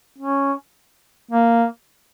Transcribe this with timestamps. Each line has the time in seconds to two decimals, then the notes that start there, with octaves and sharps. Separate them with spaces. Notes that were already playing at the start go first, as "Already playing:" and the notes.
0.19 C#4
1.31 A#3